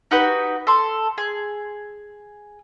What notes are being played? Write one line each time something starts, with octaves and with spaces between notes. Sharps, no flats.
D#4 F#4 G4 B4
A4 C6
G#4